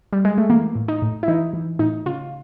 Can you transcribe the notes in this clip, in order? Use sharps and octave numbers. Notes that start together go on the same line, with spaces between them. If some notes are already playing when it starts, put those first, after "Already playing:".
G3
G#3
A3
E3 A#3
A2
D#4
A2
E4
E3 D#4
E3
A2 D#4
C#3 F4